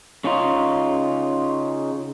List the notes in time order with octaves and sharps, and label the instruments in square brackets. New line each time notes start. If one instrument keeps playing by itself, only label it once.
[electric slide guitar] C#3 C#4 D#4 F4